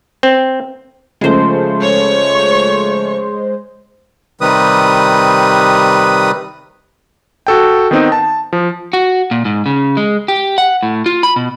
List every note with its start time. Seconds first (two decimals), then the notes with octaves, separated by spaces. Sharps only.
0.23 C4
1.21 C#3 F3 G#3 A3 C5
1.81 C#5 C#6
4.41 C3 D#3 G3 B4 D#6
7.47 F#4 A4 G5
7.91 D#3 B3 C4 D#4
8.12 A5
8.53 F3
8.93 F#4
9.31 A#2
9.45 G#2
9.66 C#3
9.97 G#3
10.28 G4
10.58 F#5
10.83 A2
11.06 F4
11.23 B5
11.36 B2